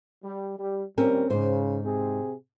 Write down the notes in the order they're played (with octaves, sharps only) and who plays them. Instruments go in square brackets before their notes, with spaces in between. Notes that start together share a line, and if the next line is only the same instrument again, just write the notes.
[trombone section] G3
G3
[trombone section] A#2 D#3 G3 [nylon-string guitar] C4 C#4 A#4
[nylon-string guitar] G#2 C5 [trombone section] C#3
[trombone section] C3 C4 G#4